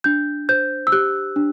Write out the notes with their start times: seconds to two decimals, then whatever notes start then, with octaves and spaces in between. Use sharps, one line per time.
0.04 D4 G6
0.49 C5 G6
0.87 E6
0.92 G4 F#6
1.36 D4